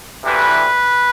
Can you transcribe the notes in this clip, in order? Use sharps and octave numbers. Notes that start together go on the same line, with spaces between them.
D2 C3 E3 G3 B4